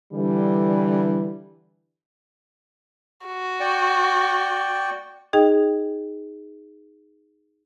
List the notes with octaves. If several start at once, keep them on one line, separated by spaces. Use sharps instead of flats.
D3 E3 G3
F#4
D5 G5 C#6
D#4 G#4 D#5 G5